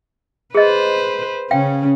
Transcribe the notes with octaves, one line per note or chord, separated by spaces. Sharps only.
G#4 B4 C5 D#5
C#3 C#4 F5 G5